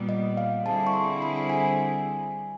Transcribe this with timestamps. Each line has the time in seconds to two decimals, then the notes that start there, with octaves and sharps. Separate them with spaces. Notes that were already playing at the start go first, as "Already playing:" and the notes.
Already playing: A#2 G3 B3
0.09 D#5
0.37 F5
0.66 D3 G3 C4 E4 G#4 A5
0.87 C#6
0.93 C6
1.22 B5
1.50 G#5